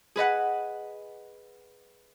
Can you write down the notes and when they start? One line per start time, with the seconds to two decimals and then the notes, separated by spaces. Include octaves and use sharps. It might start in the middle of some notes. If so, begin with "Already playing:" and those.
0.16 G#4 B4 D#5 F#5